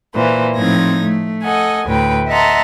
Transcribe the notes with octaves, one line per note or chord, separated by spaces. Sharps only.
A#2 E3 C5
A2 F3 C4 D#4 G#6 A#6
A3
A4 D#5 F#5 G#5
D2 A2 A3 B4 G5
D#5 E5 F#5 A5 A#5 C6